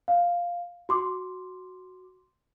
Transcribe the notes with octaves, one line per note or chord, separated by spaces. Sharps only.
F5
F#4 C6 D6